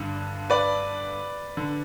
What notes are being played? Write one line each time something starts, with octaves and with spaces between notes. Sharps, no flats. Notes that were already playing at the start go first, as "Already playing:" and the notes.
Already playing: G2 D3
B4 D5
D3